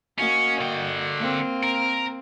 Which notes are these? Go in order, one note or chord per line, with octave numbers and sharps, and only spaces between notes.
A#3 C#4 F#4 D#5
D3 G5
A#3 C4
A#4